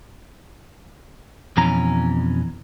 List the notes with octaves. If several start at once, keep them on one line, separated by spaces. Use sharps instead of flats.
F2 B2 E3 C#4 A#5